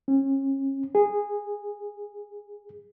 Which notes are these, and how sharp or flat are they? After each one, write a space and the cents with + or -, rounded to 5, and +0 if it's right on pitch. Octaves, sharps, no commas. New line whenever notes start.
C#4 -35
G#4 -15